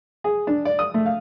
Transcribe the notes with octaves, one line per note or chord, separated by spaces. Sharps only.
G#4
D4
D5
D#6
A3
F5